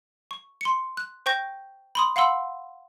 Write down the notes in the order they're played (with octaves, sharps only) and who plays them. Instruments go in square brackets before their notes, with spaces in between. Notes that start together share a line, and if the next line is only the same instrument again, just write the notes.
[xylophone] C#6
C6 C#7
F#6
C5 G5 C#6 G6 A#6
B5 C6 D#6
F5 F#5 B5 C6 E6